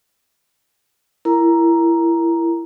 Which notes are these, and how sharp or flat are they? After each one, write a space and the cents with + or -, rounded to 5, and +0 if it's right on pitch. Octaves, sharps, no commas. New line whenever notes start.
E4 +20 A#4 +0 A#5 +5